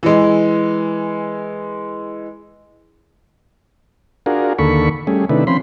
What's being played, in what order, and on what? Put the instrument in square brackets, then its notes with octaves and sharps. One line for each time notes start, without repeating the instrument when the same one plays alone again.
[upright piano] E3 G#3
[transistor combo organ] D4 F4 F#4 G#4 A#4
D#2 D3 A#3 A4 B5 C#6
G3 A3 C#4 G#4
C3 D#3 A3 D4 E4 B4
F3 C4 C#4 B5 C6